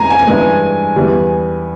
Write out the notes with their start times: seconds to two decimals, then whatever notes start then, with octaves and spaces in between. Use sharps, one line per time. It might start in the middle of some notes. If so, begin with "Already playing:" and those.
Already playing: F2 E3 G#3 G#5 A#5
0.10 G#5
0.27 G2 E3 G#3
0.96 E2 E3 G3